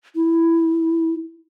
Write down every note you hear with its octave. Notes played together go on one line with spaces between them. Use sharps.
E4